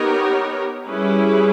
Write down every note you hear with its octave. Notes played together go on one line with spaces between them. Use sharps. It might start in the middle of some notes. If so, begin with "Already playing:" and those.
Already playing: B3 D#4 G4 A#4 C#5
G3 C#4 E4 G#4 B4